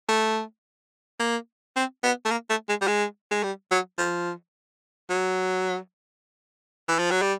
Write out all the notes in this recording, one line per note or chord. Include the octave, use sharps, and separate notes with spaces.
A3
A#3
C4
B3
A3
A#3
A3
G#3
G3
G#3
G#3
G3
F#3
F3
F#3
E3
F3
F#3
G3